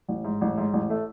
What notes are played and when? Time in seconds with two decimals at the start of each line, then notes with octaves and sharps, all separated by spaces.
0.08 A1
0.25 G#2
0.41 A1
0.58 G#2
0.73 A1
0.90 A3